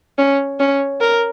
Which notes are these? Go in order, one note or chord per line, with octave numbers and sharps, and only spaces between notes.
C#4
C#4
A#4